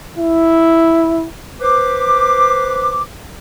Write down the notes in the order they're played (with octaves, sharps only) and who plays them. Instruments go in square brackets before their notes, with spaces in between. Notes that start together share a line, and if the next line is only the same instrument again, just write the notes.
[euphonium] E4
[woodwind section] B4 C5 D6